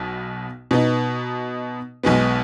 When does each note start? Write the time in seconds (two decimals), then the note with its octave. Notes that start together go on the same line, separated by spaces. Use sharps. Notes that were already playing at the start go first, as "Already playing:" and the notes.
Already playing: B1 B2
0.71 B2 B3 D#4
2.03 B1 B2 G#3 B3